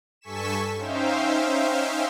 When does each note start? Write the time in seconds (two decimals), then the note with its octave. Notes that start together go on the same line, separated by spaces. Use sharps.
0.21 G2 A4 G#5 C#6 B6 E7
0.76 C#4 D#4 C5 E5 F5 G5